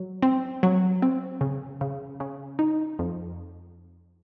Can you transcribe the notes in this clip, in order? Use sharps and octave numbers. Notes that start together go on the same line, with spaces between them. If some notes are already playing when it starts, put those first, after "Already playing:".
Already playing: F#3
C4
F#3
C4
C#3
C#3
C#3
D#4
F2